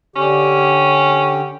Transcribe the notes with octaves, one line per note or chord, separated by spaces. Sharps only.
D3 C#4 G4